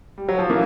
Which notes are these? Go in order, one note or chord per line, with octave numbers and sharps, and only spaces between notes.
G3
F#3
F3
E3 A#3